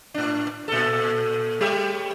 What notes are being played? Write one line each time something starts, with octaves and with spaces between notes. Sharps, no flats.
A2 D4
A#2 A4
G3 G4 C#5